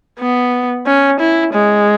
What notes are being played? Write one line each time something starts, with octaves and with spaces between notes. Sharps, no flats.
B3
C#4
E4
G#3